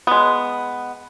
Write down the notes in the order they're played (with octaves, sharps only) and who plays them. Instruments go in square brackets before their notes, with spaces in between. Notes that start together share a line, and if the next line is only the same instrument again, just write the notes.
[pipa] G#3 B3